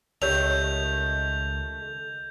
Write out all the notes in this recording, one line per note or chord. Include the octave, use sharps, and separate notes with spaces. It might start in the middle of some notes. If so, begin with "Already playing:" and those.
C#2 D#3 A3 G4 C#5 E6 G6 F7